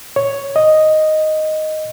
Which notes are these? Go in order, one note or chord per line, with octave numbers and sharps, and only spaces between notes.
C#5
D#5